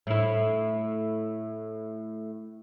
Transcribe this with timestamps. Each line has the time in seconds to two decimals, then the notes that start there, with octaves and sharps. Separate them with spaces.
0.07 A2 E4